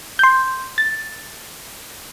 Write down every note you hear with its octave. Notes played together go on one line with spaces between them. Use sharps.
C6 G6
A6